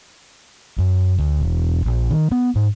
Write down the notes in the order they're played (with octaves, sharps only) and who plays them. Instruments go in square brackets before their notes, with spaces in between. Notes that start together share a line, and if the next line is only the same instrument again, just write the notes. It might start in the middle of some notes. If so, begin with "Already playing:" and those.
[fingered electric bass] F#2
D2
E1
A#1
D#3
B3
G#2